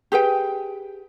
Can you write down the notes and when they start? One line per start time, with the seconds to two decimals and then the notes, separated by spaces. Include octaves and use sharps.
0.12 G4 G#4 B4 G5